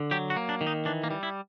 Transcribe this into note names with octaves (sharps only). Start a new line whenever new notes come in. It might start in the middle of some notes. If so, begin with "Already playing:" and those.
Already playing: D3
F#3 G4
F#4
A#3
D4
D#3
D#4
E3 D4
A#3
G3
E4